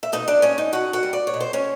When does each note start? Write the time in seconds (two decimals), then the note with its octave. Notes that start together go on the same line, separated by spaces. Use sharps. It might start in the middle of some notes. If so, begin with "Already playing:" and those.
0.03 E5
0.12 B2 D#4 D#5
0.28 D4 D5
0.42 G3 C#4 C#5
0.58 D#4 D#5
0.73 B2 F#4 F#5
0.93 F#4 F#5
1.03 G3
1.13 D5
1.27 C#5
1.34 B2
1.40 C5
1.53 C#4 C#5